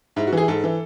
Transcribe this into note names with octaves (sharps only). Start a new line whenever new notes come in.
G#2 E4
F#4
E3
G#4
G#2 A4
E3